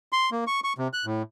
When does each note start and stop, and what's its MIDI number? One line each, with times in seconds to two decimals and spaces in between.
0.12 0.30 84
0.32 0.44 58
0.47 0.60 85
0.64 0.73 85
0.78 0.88 48
0.93 1.05 90
1.05 1.22 45